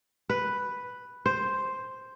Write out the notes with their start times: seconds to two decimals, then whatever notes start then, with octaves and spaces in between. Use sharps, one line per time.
0.30 B4
1.26 C5